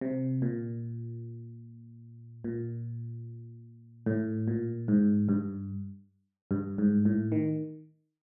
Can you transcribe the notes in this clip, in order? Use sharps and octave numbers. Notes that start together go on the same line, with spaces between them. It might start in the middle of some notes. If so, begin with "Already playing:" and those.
C3
A#2
A#2
A2
A#2
G#2
G2
G2
G#2
A2
D#3